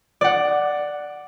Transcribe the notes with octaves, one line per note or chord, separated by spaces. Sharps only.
D5 F#5